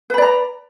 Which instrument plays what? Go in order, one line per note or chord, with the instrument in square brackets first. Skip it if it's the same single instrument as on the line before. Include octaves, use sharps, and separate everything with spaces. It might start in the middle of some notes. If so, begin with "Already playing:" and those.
[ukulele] B4
B5
D5
A#5